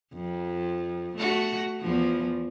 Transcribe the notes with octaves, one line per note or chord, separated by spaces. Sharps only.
F2
A3 F#4
E2 F3